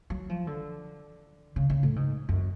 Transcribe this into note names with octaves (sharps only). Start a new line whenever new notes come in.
F#3
F3
D3
C#3
C#3
A2
G#2
F#2